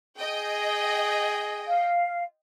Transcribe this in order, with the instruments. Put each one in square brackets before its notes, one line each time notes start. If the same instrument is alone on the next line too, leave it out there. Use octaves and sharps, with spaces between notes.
[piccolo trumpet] G#4 [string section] D#5 G5
[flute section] F5